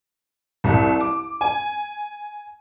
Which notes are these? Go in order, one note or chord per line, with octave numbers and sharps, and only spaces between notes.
C2
D6
G#5